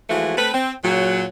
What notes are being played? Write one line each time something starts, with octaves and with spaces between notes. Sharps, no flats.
E3 F3 G#3 A3 F#4
A3 C4 B4
C4
A#2 C#3 F#3